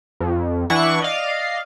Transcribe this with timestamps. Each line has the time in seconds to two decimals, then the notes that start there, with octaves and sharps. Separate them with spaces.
0.20 F2
0.70 E3 D4 E4 F#5 C#6
1.00 D5 D#5 F5